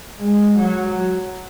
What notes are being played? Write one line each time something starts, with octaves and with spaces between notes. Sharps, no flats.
G#3
F#3